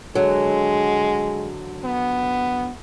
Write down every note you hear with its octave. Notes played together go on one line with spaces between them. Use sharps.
D3 F#3 G#3
B3